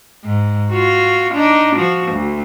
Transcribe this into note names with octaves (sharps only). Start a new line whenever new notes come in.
G#2
F4 F#4
D4 D#4
F3 F#4
D2